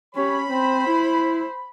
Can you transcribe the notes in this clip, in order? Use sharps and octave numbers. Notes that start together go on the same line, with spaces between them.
C#4 G4 C#5 B5
C4 C5
E4